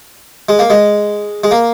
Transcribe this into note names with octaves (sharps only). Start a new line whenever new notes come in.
G#3
A#3
G#3
G#3
A#3